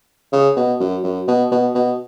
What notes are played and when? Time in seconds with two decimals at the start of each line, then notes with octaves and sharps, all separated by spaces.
0.32 C#3
0.56 B2
0.80 F#2
1.04 F#2
1.28 B2
1.51 B2
1.75 B2